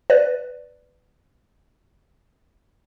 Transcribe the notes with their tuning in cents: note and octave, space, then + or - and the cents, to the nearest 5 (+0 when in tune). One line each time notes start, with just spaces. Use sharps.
B4 +10 D5 +0